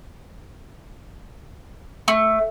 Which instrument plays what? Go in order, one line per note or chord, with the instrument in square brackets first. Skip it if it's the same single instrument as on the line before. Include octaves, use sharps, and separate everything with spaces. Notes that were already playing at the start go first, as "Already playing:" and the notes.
[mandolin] A3